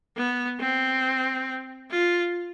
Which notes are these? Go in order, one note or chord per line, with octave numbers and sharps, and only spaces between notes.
B3
C4
F4